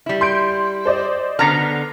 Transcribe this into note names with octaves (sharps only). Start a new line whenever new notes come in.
G3 E4
C6 G6 D7
C5 D5 D#5
D3 B3 A#5 F6 A#6 C7